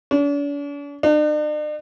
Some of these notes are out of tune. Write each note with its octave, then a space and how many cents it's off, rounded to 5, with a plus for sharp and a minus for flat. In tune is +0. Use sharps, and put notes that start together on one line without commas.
D4 -45
D4 +45